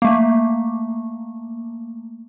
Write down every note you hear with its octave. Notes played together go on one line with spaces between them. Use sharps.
A3 A#3